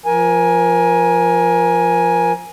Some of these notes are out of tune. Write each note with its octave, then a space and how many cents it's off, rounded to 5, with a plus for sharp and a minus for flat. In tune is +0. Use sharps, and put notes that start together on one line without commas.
F3 +0 A#4 +25 G#5 +0